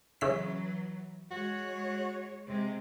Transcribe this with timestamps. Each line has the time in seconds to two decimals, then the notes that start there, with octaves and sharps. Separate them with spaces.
0.21 C#3 E3 F#3 E4 B6
1.31 G#3 F#4 C#5
2.46 C3 G#3